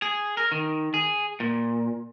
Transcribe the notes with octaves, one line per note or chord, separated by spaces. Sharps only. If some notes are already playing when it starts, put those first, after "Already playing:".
G#4
A#4
D#3
G#4
A#2